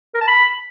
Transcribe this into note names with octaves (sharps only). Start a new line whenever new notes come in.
A#4
A5
B5